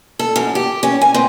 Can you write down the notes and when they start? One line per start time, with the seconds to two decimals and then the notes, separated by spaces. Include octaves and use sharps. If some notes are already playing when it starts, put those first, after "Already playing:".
0.19 A4
0.36 F#2
0.55 G4
0.83 C#4
1.01 G#5
1.14 C4